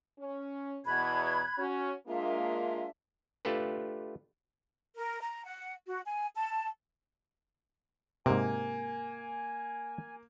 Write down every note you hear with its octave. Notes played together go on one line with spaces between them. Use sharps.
C#4
E2 B2 B5 F#6 G#6
C#4 F#4
G#3 A#3 D4 F4 E5
A3 D4 F4 G4 A4 B4
A#4
A#5
F#5
F#4
G#5
A5
G#2 C3 A#3 G#5